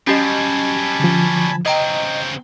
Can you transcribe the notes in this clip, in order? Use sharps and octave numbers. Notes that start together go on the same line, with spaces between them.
F#3 G3 C#4 G4 D#5 G#5 A5 B5
D3 F3
C#3 C4 D#5 G5 A#5 G#6